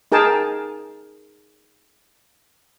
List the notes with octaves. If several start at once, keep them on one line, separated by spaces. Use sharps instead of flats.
D#4 G#4 A#4 G5 A5